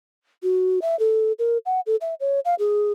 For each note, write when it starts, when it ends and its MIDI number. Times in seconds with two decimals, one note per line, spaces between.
0.43 0.79 66
0.82 0.98 76
0.99 1.32 69
1.39 1.58 70
1.66 1.80 78
1.86 1.96 69
2.01 2.14 76
2.20 2.40 73
2.45 2.55 77
2.59 2.93 68